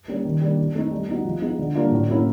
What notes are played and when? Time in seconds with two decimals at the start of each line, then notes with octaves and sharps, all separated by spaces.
0.08 G3 A#3 C#4
0.25 D#3
0.41 G3 A#3 D4
0.58 E3
0.75 A3 C4 D#4
0.91 G3
1.09 B3 D#4 F#4
1.25 F3
1.42 G#3 B3 D#4
1.59 D3
1.75 G3 A#3 D4 F4
1.91 A2
2.09 F#3 A#3 C#4 E4